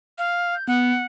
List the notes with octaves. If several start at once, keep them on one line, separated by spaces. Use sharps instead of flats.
F5
G6
B3 F#5